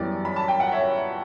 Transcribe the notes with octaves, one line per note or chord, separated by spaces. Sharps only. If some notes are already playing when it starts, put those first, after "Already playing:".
Already playing: F#2 E3 G3 B3 D5
B5
A5
G5
F#5
C#5 E5